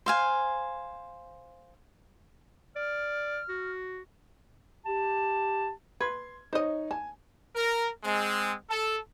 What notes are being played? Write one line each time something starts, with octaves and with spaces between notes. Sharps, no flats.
C5 F5 G#5
D5 F6
F#4
G4 A5
B4 C6 G#6
D#4 C5 C#5 D#5
G#5 A5
A#4
G#3 C4
A4